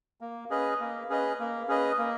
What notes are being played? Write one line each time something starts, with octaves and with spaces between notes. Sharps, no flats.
A#3
C#4 G#4 B4 D#5
A#3
C#4 G#4 B4 D#5
A#3
C#4 G#4 B4 D#5
A#3